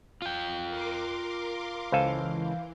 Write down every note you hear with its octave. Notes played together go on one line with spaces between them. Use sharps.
F4 G5
A#4 C6 D6
C#2 E3 A4 C5 F5 G#5